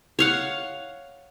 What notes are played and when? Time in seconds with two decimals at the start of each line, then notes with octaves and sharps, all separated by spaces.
0.19 C#5 F5 F#5